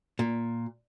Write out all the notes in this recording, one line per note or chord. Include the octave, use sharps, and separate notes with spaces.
A#2